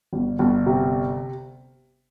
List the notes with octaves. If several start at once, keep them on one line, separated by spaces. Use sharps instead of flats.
G1
G1
C3